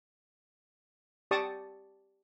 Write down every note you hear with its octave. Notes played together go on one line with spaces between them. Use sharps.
G4 D5 A5 C#6 D#6